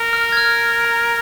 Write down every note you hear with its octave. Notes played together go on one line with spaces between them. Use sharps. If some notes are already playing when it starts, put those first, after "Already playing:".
Already playing: A#4
F6
G#6
F6
A#5